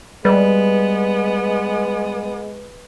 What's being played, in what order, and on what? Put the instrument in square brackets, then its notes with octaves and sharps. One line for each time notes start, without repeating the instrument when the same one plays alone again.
[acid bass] G3 [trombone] G#3 [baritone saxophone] B3 [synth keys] B4